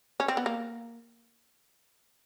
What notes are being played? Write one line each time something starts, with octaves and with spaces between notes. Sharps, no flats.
C#4
C4
B3
A#3